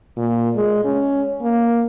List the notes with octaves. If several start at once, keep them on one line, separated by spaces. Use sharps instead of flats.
A#2
G#3
C#4
A#3